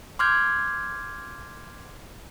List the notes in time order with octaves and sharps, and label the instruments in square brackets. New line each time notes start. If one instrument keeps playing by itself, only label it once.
[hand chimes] C6 D6 F6 G6 G#6